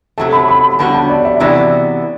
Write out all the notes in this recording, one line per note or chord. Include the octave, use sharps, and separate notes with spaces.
C3 F#3 A3 A5
B5
B5
B5
D3 G3 B3 F#4 A5
A5
D5
E5
C3 E3 B3 F#4 D5